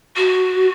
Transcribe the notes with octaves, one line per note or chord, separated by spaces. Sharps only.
F#4